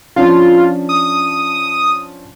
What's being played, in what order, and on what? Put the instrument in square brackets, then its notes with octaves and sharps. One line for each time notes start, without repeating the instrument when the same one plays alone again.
[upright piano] F3 C#4 D4 [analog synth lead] F4
[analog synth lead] D#6